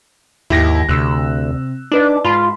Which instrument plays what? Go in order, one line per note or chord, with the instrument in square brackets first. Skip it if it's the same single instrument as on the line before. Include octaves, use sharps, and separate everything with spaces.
[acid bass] D#2 [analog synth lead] G#2 [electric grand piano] E4 G4 A#6
[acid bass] D2 [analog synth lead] C3 [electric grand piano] E6 F#6
[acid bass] D4 [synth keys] D#4 B4 D5 [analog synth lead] D6
[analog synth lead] G#2 [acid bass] F4 [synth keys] A5 B5 C6